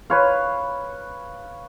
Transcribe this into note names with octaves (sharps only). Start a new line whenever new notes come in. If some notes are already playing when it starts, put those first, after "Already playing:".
B4 C#5 F5